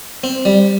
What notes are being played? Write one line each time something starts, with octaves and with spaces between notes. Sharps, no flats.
C4
G3